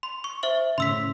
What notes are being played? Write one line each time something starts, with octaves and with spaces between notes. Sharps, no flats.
C6
C#6
C5 E5 F#7
A2 C#3 C6 E6 B6